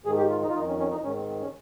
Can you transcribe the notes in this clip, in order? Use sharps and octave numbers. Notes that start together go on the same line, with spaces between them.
G#2 D#3 G#4
G4
F4
D#4
F4
F2 D#3 D#4
C#4
C#4
D#4
G#2 D#3 C#4
C4
C4
C#4